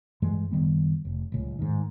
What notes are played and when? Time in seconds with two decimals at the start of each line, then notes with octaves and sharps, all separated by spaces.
0.22 G2 E3 G#3
0.51 F#1 D#3 G3 B3
1.05 F1
1.32 D1 C#2
1.59 G#2 D#3